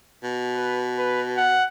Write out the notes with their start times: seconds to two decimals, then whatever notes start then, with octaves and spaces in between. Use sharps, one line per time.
0.23 B2
0.56 B4
0.98 B4
1.37 F#5